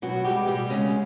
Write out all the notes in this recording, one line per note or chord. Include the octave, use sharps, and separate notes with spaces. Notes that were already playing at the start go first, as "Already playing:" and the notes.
B2 F#3 F#4
G3 G#3 G4
B2 G3 G4
C#3 G#3 C#4